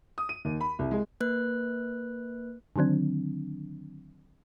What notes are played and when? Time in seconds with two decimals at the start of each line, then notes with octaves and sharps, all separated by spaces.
0.18 D#6
0.29 D#7
0.45 D#2
0.61 B5
0.79 C2
0.91 G#3
1.21 A#3 B4 F#6
2.76 D3 D#3 F#3 C4 D4